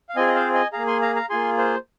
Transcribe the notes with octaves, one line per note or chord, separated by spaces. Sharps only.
F5
C4 F4 G#4 D#5 G#5
D#5
C5 F5
D#5 G#5
A#3 G#4 F5 A#5
G#5 C6
F5 A#5
F5 A#5
A#3 F4 G#4 G#5 C6
C5